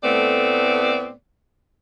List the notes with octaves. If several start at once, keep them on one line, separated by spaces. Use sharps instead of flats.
A2 A3 B3 C4 D5